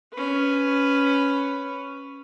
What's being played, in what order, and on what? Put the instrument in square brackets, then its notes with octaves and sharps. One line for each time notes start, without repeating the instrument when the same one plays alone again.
[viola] C#4 B4